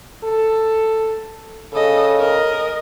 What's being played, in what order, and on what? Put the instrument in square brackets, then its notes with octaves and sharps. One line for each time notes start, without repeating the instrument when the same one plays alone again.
[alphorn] A4
[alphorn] C#3 [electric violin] A4 D#5
[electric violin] A#4 D#5